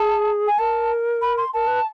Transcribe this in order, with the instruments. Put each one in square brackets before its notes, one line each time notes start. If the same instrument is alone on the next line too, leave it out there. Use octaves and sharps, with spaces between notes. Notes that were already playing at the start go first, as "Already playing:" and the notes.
Already playing: [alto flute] G#4 [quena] A5
[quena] G#5
[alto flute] A#4 [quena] A5
[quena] B5
C6
[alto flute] A#4 [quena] A5
[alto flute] B4